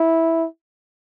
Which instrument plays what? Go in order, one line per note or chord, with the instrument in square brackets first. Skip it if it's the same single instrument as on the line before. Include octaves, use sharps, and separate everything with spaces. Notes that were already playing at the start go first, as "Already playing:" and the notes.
Already playing: [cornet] E4